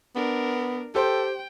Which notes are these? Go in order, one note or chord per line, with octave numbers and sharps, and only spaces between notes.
B3 D4 A#4
G4 A4 C5 G5